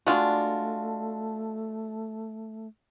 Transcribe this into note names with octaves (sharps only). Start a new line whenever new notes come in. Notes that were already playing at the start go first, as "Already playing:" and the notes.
G#3 A3 D4 F4 F#4